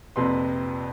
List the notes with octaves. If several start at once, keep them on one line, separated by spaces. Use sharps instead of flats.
A#1 F2 C3 B4 C6